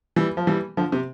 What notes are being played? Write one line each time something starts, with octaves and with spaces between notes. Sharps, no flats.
E3 G3
F3
E3 G3
D3 F3
C3